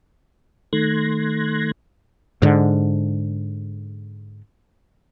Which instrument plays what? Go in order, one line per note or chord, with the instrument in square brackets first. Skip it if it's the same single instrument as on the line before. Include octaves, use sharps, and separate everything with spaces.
[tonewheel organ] D#3 A3 C6 F#6 G#6 A#6
[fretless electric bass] G#2 D3